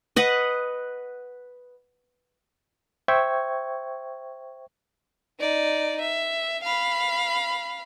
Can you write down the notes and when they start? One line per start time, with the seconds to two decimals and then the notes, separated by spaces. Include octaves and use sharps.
0.16 B4 D#5 F#5
3.08 C5 E5 G5 C#6 G#6
5.40 D#4 D5
6.01 E5
6.63 F5 B5